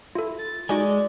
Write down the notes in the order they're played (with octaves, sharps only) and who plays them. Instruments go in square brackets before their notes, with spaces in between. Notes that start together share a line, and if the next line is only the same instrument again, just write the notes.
[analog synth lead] E4 [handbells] F4 A4
[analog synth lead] A6
[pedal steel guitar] G#3 [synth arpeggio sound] D#4 F#4 D#5 [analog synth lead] D5 [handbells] G#5